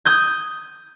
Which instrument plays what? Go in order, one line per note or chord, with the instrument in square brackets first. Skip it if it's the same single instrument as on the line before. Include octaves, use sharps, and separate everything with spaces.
[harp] D#6 G6 G#6